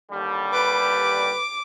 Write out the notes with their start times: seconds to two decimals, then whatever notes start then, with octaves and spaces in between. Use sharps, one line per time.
0.11 D#2 D3 G3
0.53 B4 D6